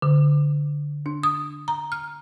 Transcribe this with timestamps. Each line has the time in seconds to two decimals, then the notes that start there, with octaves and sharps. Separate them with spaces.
0.02 D3
1.06 D4
1.23 D#6
1.68 A#5
1.92 F6